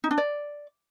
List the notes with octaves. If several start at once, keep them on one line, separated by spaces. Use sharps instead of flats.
D#4
D4
D5